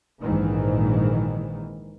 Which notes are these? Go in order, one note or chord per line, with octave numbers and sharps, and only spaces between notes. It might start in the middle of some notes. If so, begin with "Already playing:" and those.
A#1 G#2 D#3 E3